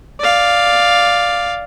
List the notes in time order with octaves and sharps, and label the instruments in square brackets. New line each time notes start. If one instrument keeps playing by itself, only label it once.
[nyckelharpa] D5 F5